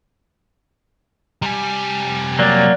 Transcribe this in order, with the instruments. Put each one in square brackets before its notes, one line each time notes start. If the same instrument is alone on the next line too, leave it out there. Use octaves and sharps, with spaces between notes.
[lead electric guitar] C3 G#5 [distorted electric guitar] G3
[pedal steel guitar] F#3 A#3 [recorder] D5